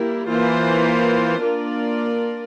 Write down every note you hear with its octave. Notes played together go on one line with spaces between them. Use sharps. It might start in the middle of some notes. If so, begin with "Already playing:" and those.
Already playing: G3 A#3 E4 A#4
E3 A#3 F4 C5
A#3 D4 F4 A#4 D5